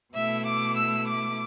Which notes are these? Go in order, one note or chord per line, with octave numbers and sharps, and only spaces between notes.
B2 A3 E4 E5
D6
E6
D6